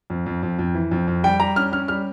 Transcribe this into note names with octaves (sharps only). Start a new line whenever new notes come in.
F2
F2
F2
F2
E3
F2
F2
G3 G5
G3 A#5
C#4 F6
C#4 F6
G3 F6